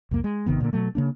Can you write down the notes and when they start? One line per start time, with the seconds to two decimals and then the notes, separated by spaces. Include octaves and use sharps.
0.11 C2 F2 A#3
0.24 G#3
0.46 G#1 C3 D#3 B3
0.60 A#2 D3 E3 A#3
0.73 B2 F#3 A3
0.95 C#3 A#3 D4